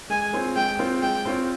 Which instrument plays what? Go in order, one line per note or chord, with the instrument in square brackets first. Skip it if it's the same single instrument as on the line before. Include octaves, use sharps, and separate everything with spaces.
[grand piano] G#3 [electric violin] G#5
[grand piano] C4 F4 G#4 C#5
[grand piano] G#3 [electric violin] G5
[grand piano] C4 F4 G#4 C#5
[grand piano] G#3 [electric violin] G5
[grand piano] C4 F4 G#4 C#5